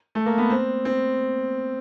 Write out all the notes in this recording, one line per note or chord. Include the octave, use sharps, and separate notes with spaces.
A3
A#3
B3
C4
C4